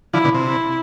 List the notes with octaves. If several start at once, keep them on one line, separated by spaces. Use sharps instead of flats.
D3 F3 E4
B2 D3
C3
E4